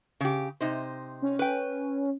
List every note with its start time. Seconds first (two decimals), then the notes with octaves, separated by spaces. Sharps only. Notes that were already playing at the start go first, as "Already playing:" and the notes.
0.20 C#3 G4
0.61 C3 D#4 C5
1.22 C#4
1.39 B4 G5